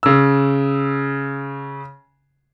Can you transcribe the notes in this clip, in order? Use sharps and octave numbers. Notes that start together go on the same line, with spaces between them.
C#3 E6